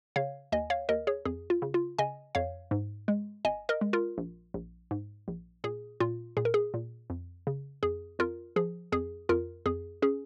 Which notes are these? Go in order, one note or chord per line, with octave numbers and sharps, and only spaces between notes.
C#3 C#5 F5
D#2 D#5 G#5
C#5 F5
D#2 A#4 D#5
G#4 C#5
F2 G#4
F4
C#3
F4
C#3 D#5 G#5
F2 C#5 F5
G#2
G#3
G#1 D#5 G#5
A#4 D#5
G#3
F4 A#4
A#1
A#1
G#2
A#1
A#2 G#4
A#2 F4
A#2 G#4
A#4
G#4
A#2
F2
C#3
F2 G#4
F2 F4 A#4
F3 G#4
F2 G#4
F2 F4 A#4
F2 G#4
C#4 G#4